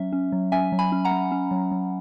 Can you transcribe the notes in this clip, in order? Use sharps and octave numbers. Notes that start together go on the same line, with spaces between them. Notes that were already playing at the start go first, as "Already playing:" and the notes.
Already playing: F#3 C#4 E5
C#4
F#3
C#4 E5 G#5
F#3
G#5 B5
C#4
F#5 A#5
C#4
C#4
F#3
F#3